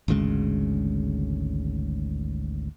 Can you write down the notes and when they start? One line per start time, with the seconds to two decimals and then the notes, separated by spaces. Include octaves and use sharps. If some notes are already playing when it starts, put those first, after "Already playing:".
0.08 G#1 D2 C#3 G#3